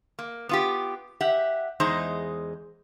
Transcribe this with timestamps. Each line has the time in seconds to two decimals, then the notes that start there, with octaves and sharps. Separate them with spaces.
0.19 A#3
0.49 B3 F4 G4
1.21 G4 E5 F#5
1.80 E2 G#3 D#4 G#4 C5